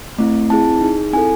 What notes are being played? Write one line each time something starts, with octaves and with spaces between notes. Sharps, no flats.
A3 C4 E4
C4 E4 G#4 A5
D#4 G#4
C4 E4 A4 G#5